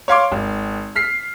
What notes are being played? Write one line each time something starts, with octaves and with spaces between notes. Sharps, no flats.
C#5 F5 C6 D6
G#1
F6 B6 C7